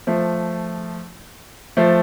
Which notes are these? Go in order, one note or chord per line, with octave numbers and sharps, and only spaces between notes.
F3 A3
F3 A3